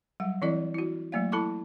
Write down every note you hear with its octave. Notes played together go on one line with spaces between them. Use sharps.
F#3 G3 F#5
E3 C4 E4 A4 D5 D#5
E4 F#4
F#3 A3 A#3 D5 F5
E4 A4 A5 B5 C#6 D6